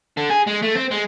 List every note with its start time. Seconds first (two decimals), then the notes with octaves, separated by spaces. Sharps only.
0.17 D3
0.30 G#4
0.47 G#3
0.63 A3
0.75 C4
0.91 G#3